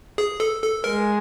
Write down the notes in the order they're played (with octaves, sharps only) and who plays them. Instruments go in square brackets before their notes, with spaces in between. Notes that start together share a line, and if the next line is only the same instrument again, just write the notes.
[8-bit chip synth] G#4
A4
A4
[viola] G#3 [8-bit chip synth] A#4